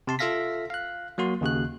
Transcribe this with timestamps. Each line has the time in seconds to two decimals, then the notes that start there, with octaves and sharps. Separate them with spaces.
0.07 C3 A5 C6
0.19 F4 A4 E5 F5 A#6 B6
0.70 F5 F#6
1.18 F#3 A#3 F#4 C6
1.41 D#2 C#3 F#4 F#6